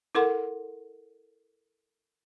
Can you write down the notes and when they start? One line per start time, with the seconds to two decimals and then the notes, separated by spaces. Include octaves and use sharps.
0.15 E4 A4 A#4 F#5 C6